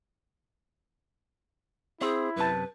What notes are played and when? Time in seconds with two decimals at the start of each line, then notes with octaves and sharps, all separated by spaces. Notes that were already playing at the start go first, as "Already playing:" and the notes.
2.01 C4 E4 G#4
2.36 F#2 C3 B4 A5